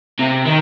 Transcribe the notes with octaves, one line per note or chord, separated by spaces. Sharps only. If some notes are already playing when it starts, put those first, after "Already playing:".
C3
D#3